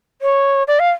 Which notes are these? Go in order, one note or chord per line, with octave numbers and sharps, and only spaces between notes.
C#5
D5
F5